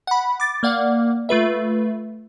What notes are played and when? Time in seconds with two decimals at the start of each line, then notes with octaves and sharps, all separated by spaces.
0.07 F#5 B5
0.40 D6 A6
0.63 A#3 D5 F5 F#5
1.29 A3 F4 B4 E5